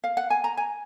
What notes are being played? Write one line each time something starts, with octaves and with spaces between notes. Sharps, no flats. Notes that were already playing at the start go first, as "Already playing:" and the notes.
F5
F#5
G#5
A#5
G#5